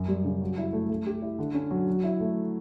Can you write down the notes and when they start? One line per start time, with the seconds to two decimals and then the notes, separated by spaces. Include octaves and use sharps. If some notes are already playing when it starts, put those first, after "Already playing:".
Already playing: F#2
0.08 G3
0.25 C#3
0.42 F#3
0.58 E4
0.73 A3
0.89 A3
1.07 G4
1.22 E4
1.39 D3
1.54 C#4
1.71 F#3
1.87 F#3
2.04 E4
2.20 A3